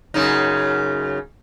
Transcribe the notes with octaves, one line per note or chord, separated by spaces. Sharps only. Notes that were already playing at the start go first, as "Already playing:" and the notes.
F#2 C#3 D#4